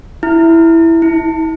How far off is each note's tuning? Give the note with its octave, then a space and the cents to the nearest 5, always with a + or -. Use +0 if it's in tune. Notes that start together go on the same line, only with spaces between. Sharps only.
E4 +0
E4 -40